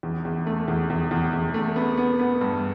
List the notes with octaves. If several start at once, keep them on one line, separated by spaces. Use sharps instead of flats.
E2
E2
A3
E2
E2
E2
E2
A3
B3
B3
B3
G2